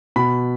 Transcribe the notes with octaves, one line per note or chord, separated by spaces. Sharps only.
B2 B5